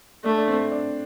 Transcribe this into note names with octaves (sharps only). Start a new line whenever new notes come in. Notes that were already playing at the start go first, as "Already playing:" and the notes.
A3 D4
D4
C4
D4